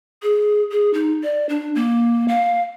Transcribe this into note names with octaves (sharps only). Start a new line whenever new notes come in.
G#4
G#4
D#4
D5
D4
A#3
F5